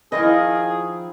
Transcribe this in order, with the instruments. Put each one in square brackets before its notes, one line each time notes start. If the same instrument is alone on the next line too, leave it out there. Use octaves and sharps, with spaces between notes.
[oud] D#3 F3 D#4 [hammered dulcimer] E4 G5 C6 [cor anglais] G#4 [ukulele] D#5